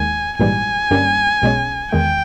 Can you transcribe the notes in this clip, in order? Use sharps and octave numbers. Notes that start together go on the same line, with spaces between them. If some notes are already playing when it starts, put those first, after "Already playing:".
Already playing: D#2 D#3 G#3 G#5
A#1 G#2 E3 G3 G#5
G1 G2 G3 A#3 C#4
B1 B2 G#3 C#4
E2 D#3 G#3 G5